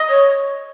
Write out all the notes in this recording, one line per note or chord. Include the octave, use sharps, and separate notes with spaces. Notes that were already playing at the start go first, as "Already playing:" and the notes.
Already playing: D#5
C#5